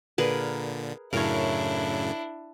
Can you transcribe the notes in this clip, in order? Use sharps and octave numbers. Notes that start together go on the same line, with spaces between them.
A#2 D3 G#4 A#4 B4
F#2 A2 C#3 D4 E4 A#4 C#5